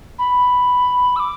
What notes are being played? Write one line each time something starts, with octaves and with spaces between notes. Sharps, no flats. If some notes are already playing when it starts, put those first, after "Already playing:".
B5
E6
D6